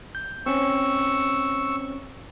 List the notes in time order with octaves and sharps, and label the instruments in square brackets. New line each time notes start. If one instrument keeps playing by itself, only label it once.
[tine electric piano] G6
[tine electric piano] C4 C#4 [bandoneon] C#6 E6